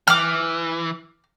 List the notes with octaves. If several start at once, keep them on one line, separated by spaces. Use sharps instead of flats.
E3 D6 F6